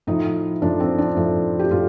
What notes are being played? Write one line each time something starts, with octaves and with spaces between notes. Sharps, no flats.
A2 F3 D#4
A2 F3 D4
C4
D4
A2 F3
G4
A2 F4